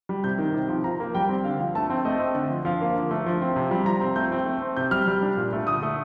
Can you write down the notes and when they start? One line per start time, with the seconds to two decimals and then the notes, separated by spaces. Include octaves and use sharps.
0.09 G3
0.24 C3 G6
0.38 D#3
0.54 C3
0.69 F3
0.84 F3 A#5
1.00 A#3
1.15 G3 G5
1.29 C4
1.44 D3 F5
1.60 F3
1.75 A3 A5
1.90 C4
2.05 A3 D#5
2.20 C4
2.35 D3
2.50 F3
2.65 F3 F5
2.81 A#3
2.95 D3
3.11 A3
3.26 F3
3.41 C4
3.56 C3
3.71 G3
3.86 F3 A#5
4.01 C4
4.16 A3 G6
4.32 C4
4.46 A3
4.62 C4
4.77 C3 G6
4.91 G3 F6
5.07 G3
5.22 D4
5.37 A#2
5.53 A3
5.67 D3 D#6
5.83 A3